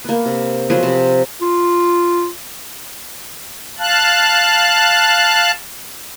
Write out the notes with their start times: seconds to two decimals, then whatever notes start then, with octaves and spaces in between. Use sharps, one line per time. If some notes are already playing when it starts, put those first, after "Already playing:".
0.04 A#3 B3
0.26 C3
0.70 F3 F#3 B3 G#4
0.83 C3
1.42 F4
3.79 F5 A5 F#6